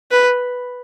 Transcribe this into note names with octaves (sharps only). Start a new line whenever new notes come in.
B4